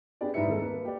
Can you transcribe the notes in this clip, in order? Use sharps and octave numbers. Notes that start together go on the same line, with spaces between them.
B3 D4 G4 G#4 D5
G#2 G3 E4 B4 E5 C#7
D#2 G#3 A4
A#3 B4
G4 D5